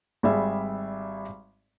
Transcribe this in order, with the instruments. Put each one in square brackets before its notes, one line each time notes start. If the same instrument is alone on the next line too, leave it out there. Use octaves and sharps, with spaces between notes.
[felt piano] G#1 G3 G#4 E5